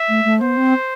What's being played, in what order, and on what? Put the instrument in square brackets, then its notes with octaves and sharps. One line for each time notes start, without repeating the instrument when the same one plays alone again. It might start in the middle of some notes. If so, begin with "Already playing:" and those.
Already playing: [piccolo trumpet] E5
[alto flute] A3
A3
[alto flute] B3 [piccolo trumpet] C5
[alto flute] C4